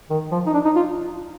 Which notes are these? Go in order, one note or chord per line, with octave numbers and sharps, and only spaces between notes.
D#3
F3
D#4
D4
D#4
F4